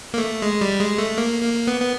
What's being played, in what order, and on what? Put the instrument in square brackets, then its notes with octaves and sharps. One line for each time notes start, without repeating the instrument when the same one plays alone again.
[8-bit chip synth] A#3
A3
G#3
G3
G#3
A3
A#3
A#3
B3
B3